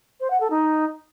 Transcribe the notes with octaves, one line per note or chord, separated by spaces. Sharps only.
C5
F#5
A4
D#4